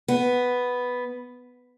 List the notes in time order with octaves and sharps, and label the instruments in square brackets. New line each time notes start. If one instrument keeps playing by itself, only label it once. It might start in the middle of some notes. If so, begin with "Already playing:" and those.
[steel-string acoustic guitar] B3